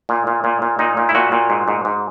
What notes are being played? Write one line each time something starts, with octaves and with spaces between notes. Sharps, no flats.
A#2
A#2
A#2
A#2
A#2 D#4
A#2
E4
A#2 F#4
A#2
G#2
G#2
G#2